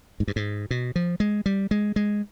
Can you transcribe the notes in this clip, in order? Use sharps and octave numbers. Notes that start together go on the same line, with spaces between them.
G#2
G2
G#2
B2
F3
G#3
G3
G#3
G#3